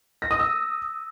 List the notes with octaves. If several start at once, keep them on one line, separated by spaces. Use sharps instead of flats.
A#6
D#6
E6